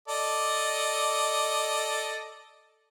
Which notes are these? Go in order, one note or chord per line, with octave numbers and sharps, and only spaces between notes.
A4 D5 D#5